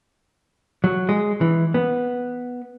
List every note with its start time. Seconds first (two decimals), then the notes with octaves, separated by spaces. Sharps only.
0.84 F#3
1.09 G#3
1.41 E3
1.74 B3